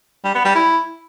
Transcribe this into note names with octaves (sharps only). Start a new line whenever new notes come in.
G3
B3
G3
E4